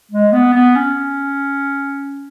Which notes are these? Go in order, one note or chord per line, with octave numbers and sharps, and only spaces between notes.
G#3
B3
B3
C#4